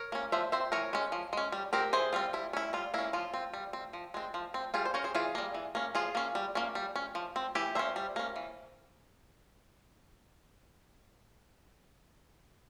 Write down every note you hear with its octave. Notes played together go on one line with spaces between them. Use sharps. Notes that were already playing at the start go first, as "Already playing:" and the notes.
Already playing: A#4 C#5
A#3 C#4
F3 C5 E5
C4 C5 E5
E3 A#4 C#5
G#3 C#4
F3
G#3 C#4
G3
C4 G4 A#4
E3 G#4 C5
G3 C4 F4
G3 E4
C#4 E4
G3 F4
A#3 C#4 E4
F3 F4
C4
G3
C4
F3
G#3 C4
F3
C4
G3 F4 G#4
C5
C#4 A#4 C#5
G#4 C5
E3 F4 G#4
G3 A#3
E3
A#3 C#4
F3 F4 G#4
A#3 C#4
G3
A#3 C#4
G3
C#4
F3
C4
E3 E4 G4
A#3 C#4 C5 E5
G3
A#3 C#4
E3